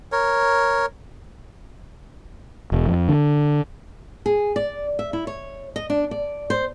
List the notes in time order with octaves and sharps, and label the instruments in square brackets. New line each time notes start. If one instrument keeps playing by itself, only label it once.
[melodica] A#4 C#5
[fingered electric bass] E1
F2
D3
[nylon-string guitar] G#4
D5
E5
E4
C#5
D#5
D4
D5
C5